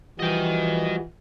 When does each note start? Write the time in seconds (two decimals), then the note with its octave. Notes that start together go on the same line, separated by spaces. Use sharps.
0.19 E3 F3 G3 F#4 D#5 G5